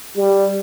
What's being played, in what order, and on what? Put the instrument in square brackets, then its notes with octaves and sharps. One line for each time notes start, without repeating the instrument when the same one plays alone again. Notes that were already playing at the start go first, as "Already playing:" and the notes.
[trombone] G3